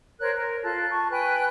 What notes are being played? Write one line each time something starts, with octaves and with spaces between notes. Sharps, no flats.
A#4 C5 C#5 F#6
A#4
F4 A4 F#6
A5 C#6
B4 G5 G#5 F#6